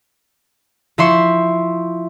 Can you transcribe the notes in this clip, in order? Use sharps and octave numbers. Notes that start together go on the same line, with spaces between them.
F3 E4 E5 C6 C#6